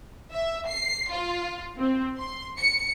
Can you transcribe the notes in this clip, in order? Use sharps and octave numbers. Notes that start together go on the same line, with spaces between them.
E5
C7
F4
C4
C6
C#7